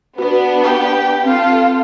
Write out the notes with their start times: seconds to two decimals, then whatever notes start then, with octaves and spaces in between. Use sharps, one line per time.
0.18 B3 D4 F#4 B4
0.64 G4 G5
1.24 C4 F4 A4